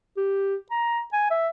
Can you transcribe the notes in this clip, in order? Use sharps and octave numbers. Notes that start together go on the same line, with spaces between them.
G4
A#5
G#5
E5